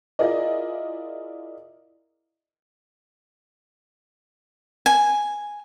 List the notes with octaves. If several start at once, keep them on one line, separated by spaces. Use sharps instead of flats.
E4 F4 G#4 A#4 D5 D#5
G#5